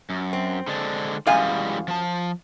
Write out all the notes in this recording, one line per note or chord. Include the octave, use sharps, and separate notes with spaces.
F#2
C4
D3 G#3 D4
F#2 E3 G3 G#3 F5 G#5
F3 A5